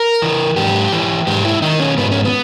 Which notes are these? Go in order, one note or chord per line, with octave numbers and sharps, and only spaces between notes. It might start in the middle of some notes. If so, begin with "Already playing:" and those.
Already playing: A#4
E3
G#2 G4
E3
G#2 G4
E4
D#3 D#4
C#4
G#2 B3
C#4
B3